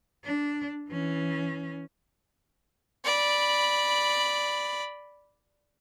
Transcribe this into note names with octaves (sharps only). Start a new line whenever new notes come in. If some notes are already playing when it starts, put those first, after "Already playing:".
D4
E3 C#4
D5 B5